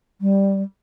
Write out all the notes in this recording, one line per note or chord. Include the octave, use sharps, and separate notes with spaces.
G3